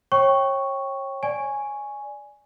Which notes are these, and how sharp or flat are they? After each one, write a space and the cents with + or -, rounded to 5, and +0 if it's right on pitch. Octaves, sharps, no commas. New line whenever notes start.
C#5 -30 G5 +0 C#6 +0
D5 +0 G#5 +0 C#6 +0